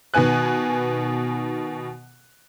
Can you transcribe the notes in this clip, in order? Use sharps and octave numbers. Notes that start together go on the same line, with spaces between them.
B2 D#3 B3 G#5 F#6